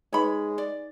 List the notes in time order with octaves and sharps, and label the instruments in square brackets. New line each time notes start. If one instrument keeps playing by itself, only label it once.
[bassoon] G#3 [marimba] D#4 B4 [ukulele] C#5 B5
[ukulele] D5